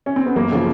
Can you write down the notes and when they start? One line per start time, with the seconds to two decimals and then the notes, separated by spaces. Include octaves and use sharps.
0.06 C#4
0.16 C4
0.26 B3
0.36 F#2 A#3
0.52 C#3 F3